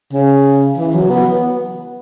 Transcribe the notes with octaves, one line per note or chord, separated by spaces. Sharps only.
C#3
E3
F#3
B3